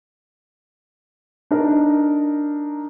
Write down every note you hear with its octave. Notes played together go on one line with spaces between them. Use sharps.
D4 D#4 A#4